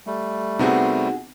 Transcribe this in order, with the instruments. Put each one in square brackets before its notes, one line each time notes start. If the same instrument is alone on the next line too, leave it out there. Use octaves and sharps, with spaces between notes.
[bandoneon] G3 A3
[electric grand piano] C3 B3 C4 [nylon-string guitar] D#4 F#4 G#4